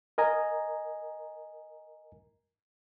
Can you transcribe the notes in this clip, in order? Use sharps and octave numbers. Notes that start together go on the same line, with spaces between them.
A#4 D#5 G#5 A#5